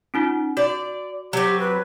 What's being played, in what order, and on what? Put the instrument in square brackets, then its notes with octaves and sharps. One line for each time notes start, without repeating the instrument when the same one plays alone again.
[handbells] C#4 D#4 F4
[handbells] F#4 [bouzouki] D5
[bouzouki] F#3 C4 [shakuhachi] G4
[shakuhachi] B4